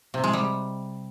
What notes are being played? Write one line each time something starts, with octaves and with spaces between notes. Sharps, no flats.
C3
G#3
G3